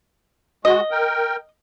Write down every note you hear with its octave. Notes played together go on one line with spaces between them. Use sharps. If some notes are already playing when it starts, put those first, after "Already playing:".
G#3 F#4 D#5
A#4 G5